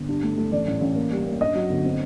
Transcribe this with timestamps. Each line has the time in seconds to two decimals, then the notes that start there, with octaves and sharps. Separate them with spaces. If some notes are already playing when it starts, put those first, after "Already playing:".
Already playing: G1
0.09 G2
0.23 A3
0.37 A3
0.52 A1 D5
0.67 A1
0.81 A1
0.96 A#3
1.12 G3
1.26 A#3
1.41 G2 D#5
1.55 F#3
1.70 G1
1.85 C4